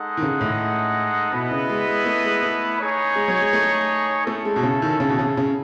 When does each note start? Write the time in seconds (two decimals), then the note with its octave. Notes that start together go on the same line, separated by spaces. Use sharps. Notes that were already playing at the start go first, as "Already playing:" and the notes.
Already playing: G#3 D#4 A4 D#5 F#5
0.17 D#3
0.22 C#3
0.41 A2
1.32 B2 B3 E4 B4 D#5
1.51 C#3
1.70 G#3
1.87 G#3
2.06 A3
2.25 G#3
2.42 A3
2.80 D#4 G#4 C#5
3.16 G#3
3.28 F#3
3.41 G#3
3.53 A3
4.26 A3 C#4 E4 A4
4.45 G#3
4.56 B2
4.63 C#3
4.82 D#3
5.00 C#3
5.09 B2
5.19 C#3
5.37 C#3